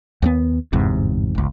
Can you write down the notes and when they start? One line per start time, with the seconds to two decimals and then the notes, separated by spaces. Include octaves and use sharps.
0.22 D#2 G3 B3
0.73 G1 E2 G#2 C3
1.35 G1 C#2